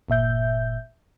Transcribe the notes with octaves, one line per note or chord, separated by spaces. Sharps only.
G1 A#2 E5 G6